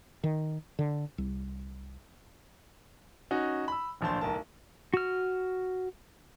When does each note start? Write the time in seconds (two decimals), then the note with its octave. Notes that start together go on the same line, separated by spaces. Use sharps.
0.24 D#3
0.79 D3
1.18 C2
3.31 C#4 D#4 F#4
3.68 B5 E6
4.01 D1 A#1 D4 C5 A5 C6
4.21 D1 B1 A#4 A5
4.94 F#4 F6